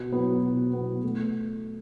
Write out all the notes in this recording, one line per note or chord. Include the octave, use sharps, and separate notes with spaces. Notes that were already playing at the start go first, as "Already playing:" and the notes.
Already playing: B2
F#3 B3
B2
F#3 B3
A3